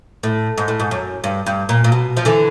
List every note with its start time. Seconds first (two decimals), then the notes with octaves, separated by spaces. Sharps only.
0.23 A2
0.58 G#2
0.68 A2
0.80 G#2
0.91 F#2
1.24 G2
1.46 G2
1.69 A#2
1.84 A#2
1.92 B2
2.17 F3
2.25 D3 E3